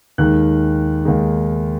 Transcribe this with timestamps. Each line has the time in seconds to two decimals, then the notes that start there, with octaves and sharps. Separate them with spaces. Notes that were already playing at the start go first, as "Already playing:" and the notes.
0.18 D#2 D#3 G#3 F#6
1.05 D#2 D#3 G#3